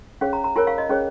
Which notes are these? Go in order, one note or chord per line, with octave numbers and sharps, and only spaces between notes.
C#4 G#4 C#5 F5
A#5
A#5
F4 A#4 C#5 G#5
F5
D#5
C#4 G#4 C#5